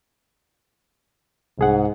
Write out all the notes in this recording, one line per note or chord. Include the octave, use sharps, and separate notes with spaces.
C2 G#2 G#4 F#5